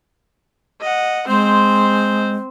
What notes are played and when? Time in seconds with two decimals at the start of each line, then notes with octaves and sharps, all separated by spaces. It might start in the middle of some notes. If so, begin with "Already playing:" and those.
0.81 D#5 F#5
1.28 G#3 C4 C5